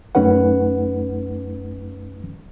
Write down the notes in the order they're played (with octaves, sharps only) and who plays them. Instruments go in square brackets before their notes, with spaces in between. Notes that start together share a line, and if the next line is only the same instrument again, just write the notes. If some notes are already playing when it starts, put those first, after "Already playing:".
[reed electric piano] F#2 A3 C#4 D#4 B4 F#5